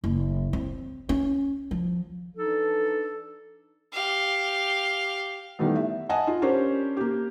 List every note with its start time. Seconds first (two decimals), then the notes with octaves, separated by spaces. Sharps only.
0.04 F#1
0.53 C4
1.09 C#4
1.71 F3
2.36 E3 D4 D#4 A4
3.93 G4 F5
5.59 D#3 E3 G3 A3 B3
5.76 E5
6.09 D#5 F#5 G#5 A5
6.27 F4
6.42 C#4 D4 G4 A#4 C5
6.97 A#3 G4